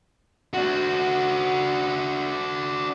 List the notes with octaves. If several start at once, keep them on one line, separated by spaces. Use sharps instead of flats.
D4 F#4